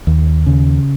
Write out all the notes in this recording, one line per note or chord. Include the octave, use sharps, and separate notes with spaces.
D#2
C#3